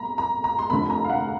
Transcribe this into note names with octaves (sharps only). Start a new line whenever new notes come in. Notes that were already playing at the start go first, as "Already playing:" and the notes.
Already playing: B1 A#2 A#5 B5
A#5
A#5
C6
F1 D#2 D3 F3 B5
A#5
F5
F#5